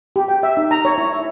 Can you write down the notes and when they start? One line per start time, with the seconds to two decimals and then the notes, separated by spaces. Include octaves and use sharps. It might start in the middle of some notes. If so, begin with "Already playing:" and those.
0.16 G4
0.28 G5
0.43 E5
0.57 D#4
0.71 A#5
0.85 C#5
0.98 E4
1.12 E5